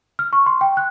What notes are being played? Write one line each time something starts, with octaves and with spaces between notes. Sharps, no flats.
F6
C#6
C6
G5
F#6